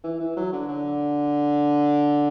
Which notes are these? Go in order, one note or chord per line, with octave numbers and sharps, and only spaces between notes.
E3
E3
F#3
D3
D3